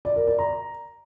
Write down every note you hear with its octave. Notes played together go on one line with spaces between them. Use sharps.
D5
A#4
D5
A#5